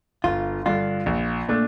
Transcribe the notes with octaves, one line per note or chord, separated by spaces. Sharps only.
G1 F4
G2 D3 F4
A#1
A#2 A3 D4